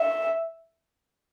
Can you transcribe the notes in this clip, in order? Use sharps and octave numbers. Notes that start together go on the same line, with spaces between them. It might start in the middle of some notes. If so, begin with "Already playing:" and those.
Already playing: E5